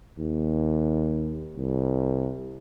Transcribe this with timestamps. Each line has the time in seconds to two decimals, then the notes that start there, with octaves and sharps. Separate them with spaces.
0.19 D#2
1.57 C2